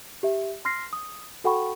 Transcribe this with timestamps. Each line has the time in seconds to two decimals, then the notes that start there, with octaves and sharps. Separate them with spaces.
0.23 G4 E5
0.65 C6 F6 A#6 C7
0.93 D#6
1.44 F#4 A4 F#5 G5 B5 C#6